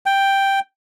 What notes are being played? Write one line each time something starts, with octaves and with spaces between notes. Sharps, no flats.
G5